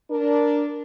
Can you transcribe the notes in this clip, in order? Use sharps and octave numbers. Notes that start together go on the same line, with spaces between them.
D4 A#4